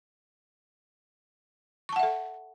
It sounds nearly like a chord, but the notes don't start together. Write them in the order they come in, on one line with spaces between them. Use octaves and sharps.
C#6 A5 F#5 E5 A4